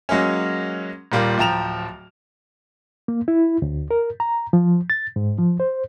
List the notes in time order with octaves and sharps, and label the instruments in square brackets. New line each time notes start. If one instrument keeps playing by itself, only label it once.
[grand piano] F#3 G#3 A#3 C#4
D#1 A#2 G3 F4 A#4
D1 F3 G5 A#5 E7 F7
[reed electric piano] A#3
E4
D2
A#4
A#5
F3
A6
G#2
F3
C5